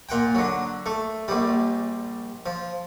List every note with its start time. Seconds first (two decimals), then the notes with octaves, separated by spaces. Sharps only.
0.09 A#2 F#5 G5
0.35 D3 F#3
0.86 A3
1.28 A#1 G3
2.46 F3